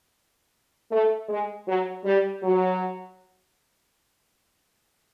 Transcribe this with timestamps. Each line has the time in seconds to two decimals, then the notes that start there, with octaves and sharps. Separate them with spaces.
0.91 A3
1.29 G#3
1.68 F#3
2.05 G3
2.43 F#3